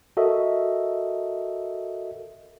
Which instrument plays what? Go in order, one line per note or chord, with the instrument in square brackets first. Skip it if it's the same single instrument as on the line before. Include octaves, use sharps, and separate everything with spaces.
[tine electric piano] F#4 A4 A#4 D#5 E5